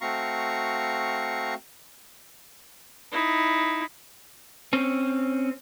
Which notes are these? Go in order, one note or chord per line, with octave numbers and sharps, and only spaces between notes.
A3 C4 F#4 F5 A#5 C#6
D#4 E4
C4 C#4